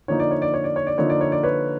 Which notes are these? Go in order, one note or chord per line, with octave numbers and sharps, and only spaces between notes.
D3 F3 A#3 D#4 C#5
D5
C#5
D5
C#5
D5
C#5
D5
D3 F3 A#3 D#4 C#5
D5
C#5
D5
B4 C#5